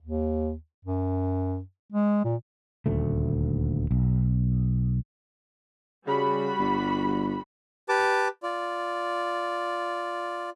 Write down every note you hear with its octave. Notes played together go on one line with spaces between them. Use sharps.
D#2
F#2
G#3
A#2
D#1 D2 A3
B1
C#3 G3 F#4 B5
G1
G4 B4 A5 D6
F4 D5